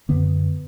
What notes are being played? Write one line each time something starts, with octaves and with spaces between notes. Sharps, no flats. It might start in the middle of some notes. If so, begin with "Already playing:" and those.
F#2 D3 B3